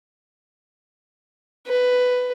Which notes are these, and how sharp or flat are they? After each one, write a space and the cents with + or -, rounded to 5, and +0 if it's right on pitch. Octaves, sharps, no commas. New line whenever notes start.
B4 +10